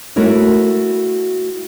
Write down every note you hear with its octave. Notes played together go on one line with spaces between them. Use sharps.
A3 E4 F#4 A#4 C#5